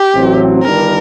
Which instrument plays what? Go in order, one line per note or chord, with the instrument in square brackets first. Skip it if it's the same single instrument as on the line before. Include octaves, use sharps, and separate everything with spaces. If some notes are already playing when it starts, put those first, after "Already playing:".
Already playing: [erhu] G4
[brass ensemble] A1 A2 F#3 C4
[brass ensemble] G1 G2 D#3 G3 D4 [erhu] A#4